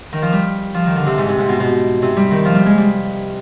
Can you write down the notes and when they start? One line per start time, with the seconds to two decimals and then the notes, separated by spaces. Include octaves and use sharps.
0.13 D#3
0.22 F3
0.32 G3
0.74 F3
0.86 D#3
0.96 D3
1.06 C3
1.18 G#2
1.29 C3
1.38 G#2
1.49 B2
1.60 B2
2.02 C3
2.17 G3
2.31 D#3
2.45 F3
2.55 G3
2.66 G#3
2.78 G3